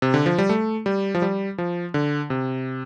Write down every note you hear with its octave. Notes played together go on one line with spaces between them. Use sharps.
C3
D3
F3
G3
A3
G3
F3
G3
F3
D3
C3